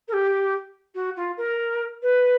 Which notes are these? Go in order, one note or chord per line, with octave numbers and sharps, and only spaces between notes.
A#4
G4
F#4
F4
A#4
B4